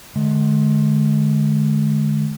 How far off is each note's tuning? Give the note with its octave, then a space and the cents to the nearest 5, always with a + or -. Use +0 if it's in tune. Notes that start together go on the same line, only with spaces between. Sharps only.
D3 +30 G#3 +40